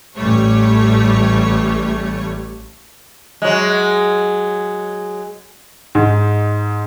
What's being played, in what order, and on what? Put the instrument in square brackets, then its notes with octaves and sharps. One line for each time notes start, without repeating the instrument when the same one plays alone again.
[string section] A1 G3 A3 C#5
[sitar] F#3 G#3
[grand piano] G#2